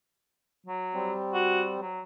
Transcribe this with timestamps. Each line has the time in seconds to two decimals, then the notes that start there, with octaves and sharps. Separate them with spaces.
0.67 F#3
0.94 G3 C4
1.34 F#4
1.80 F#3